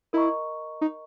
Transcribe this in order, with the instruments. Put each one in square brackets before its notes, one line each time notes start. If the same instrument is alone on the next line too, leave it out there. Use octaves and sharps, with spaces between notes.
[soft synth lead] E4 [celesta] A#4 D#5 A#5 C#6
[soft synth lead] D#4